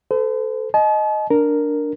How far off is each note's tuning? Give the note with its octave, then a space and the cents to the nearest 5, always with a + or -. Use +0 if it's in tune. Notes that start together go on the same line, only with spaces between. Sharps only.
A4 +0 C5 -45
D#5 +0 A5 -45
D4 +0 A#4 +0